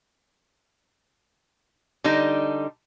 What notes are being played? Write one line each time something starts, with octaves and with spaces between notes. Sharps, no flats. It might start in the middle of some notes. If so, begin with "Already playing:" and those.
D3 G3 D#4